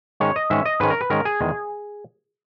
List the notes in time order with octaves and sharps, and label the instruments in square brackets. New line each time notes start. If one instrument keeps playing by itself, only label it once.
[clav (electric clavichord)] G#2 D#3 G#3 C#4 C#5
D#5
G#2 D#3 G#3 C#4 E5
D#5
G#2 D#3 G#3 C#4 B4
A#4
B4
G#2 D#3 G#3 C#4 A#4
G#4
E2 D#3 G#3